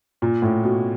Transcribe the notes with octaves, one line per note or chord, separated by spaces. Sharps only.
A#2
A2
B2